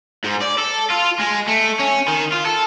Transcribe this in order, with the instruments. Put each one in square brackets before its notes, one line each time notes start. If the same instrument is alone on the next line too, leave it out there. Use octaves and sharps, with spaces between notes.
[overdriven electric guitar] G#2
D5
A4
F4
G#3
A3
C#4
D#3
F4
A4